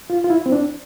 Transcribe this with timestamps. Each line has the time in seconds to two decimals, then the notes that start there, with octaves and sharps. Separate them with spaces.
0.10 F4
0.24 F4
0.30 E4
0.46 C4
0.52 D4